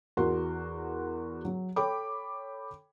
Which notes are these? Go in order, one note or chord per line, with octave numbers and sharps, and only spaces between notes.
E2 F#4 A#4 C6
F#3
A4 C#5 G5 B5 D6